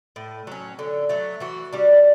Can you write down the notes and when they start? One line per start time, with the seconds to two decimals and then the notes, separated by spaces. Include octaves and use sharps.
0.16 A2
0.47 F#3 C#4
0.79 D3
1.09 F#3 A3
1.40 E3 F#4
1.73 G3 D4